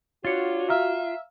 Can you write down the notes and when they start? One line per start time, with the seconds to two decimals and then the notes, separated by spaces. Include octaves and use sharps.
0.25 D4 F4 F#4 C#5 A6 C#7
0.69 E5 F5 A#5 F6